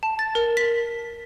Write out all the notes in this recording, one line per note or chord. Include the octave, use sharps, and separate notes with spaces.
A5
A6
A#4
B6